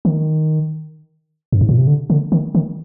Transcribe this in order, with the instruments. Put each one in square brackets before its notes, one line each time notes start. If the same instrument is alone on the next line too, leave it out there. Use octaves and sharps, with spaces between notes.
[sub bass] D#3
G2
G#2
A#2
C3
D3
D3
D#3
D#3